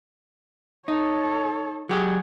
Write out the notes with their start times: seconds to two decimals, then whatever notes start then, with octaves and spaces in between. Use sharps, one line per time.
0.88 D#4 A4 C#5
1.89 F#3 G4 G#4 F#5